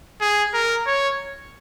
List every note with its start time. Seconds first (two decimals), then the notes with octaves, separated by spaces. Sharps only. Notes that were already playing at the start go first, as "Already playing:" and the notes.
0.21 G#4
0.54 A#4
0.87 C#5